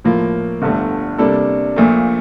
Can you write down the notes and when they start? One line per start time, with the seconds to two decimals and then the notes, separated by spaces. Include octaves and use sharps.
0.04 A2 F3 A#3 F4 A#4
0.62 G1 G2 D3 A3
1.18 C3 G3 A#3 D4 A4
1.76 A#1 A#2 A3